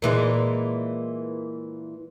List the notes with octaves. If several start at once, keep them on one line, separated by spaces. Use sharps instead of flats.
A#2 E3 G#3